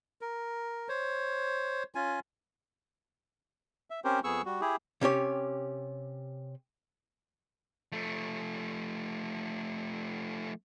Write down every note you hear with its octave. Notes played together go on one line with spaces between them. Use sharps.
A#4
C5 C#5
C#4 F4 G#5
E5
C4 C#4 G4 A#4 C5
F2 B3 G#4 C#6 E6
G3 F#4
E4 G4 G#4
C3 C#4 G4 C#5
F3 A3